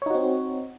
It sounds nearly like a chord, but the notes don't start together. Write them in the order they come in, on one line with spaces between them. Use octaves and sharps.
C#5 D#4 F#4 C4